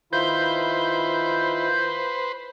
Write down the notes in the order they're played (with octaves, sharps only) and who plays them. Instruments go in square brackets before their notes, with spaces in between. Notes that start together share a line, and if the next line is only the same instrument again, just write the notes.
[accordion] D#3 E4 F4 [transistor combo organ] B4 C5 [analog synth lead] G6